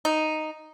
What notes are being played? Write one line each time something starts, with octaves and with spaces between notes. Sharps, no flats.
D#4